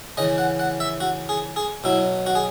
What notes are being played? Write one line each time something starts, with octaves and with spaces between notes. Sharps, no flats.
C#3 E3 D#5
F#5
F#5
E5
F#4
G#4
G#4
B2 F#3 E4
F#4
G#4